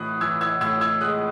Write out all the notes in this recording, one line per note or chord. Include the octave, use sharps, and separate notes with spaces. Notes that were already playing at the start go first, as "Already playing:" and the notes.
Already playing: A2 E3 D#6 F#6
E3 E6 G#6
E6 G#6
A2 E6 G#6
E6 G#6
G#3 D#6 F#6